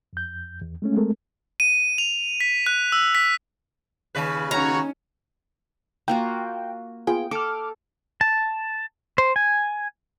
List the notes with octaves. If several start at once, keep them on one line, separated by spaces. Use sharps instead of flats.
F2 G6
E2
G#3 A3 C#4
G#3 A3 C4 A4 A#4
D#7
F7
B6
F#6
E6
B6
D#2 C#3 B4
C#4 D#4 F#4 C#5 A#5
A#3 F4 F#4 G5
B3 F4 G#4 G5
A4 D6 F6
A5
C5
G#5